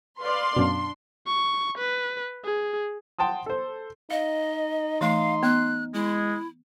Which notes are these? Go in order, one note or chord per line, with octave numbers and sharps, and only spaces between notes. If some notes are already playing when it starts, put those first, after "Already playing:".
B4 D5 F5 C6
F#2 B2 D4
C#6
B4
G#4
F#5 G5 A5 C6 D#6
A4 C5
D#4 D#5 F5
E3 A3 F5 C6
B3 F#6
G#3 E4